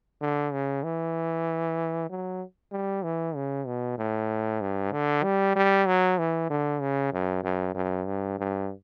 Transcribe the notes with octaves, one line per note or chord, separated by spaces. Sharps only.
D3
C#3
E3
F#3
G3
E3
C#3
B2
A2
G2
D3
G3
G3
F#3
E3
D3
C#3
F#2
F#2
F#2
G2
G2